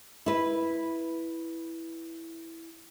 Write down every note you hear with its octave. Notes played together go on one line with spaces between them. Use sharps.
E4 B4